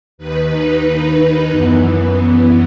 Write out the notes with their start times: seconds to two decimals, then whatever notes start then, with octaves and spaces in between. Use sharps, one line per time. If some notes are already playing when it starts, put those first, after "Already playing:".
0.18 D#2 D#3 B4
0.50 D#4
1.49 F#2 E3 B3
2.15 B3